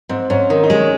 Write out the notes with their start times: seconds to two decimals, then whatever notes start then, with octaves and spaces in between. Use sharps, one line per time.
0.09 G#2 C4
0.30 G#2 C#4
0.50 D#3 D#4
0.64 D#4
0.70 G#3
0.78 C#4